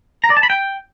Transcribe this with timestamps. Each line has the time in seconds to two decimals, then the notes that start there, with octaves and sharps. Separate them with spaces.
0.24 A#5
0.30 D5
0.37 A5
0.43 B5
0.50 G5